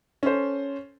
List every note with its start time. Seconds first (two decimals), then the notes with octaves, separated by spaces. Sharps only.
0.23 C#4 A4 C5